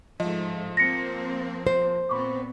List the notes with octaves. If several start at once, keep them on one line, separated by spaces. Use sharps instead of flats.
G#2 F3 G#3 A3 D#5
A#3 C4 A#6 C#7
C5
A#2 B3 C4 B5 C#6 D6